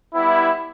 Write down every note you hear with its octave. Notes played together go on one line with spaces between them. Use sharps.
G3 B3 E4